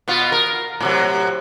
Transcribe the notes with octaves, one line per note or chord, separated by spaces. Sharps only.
B2 B3 F4
A#4
A2 C3 F#3